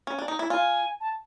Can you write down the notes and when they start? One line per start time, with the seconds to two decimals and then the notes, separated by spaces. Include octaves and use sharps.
0.07 C#4
0.18 D4
0.28 D#4
0.39 E4
0.50 F4 G#5
1.01 A5